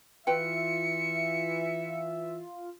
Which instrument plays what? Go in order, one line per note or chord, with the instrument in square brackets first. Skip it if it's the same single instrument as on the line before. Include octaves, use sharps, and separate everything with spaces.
[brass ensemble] E3 E5 [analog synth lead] F4 [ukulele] F#4 B4 G5 [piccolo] C#7